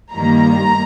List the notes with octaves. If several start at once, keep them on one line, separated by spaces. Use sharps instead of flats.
G2 D#3 G3 A#3 A#5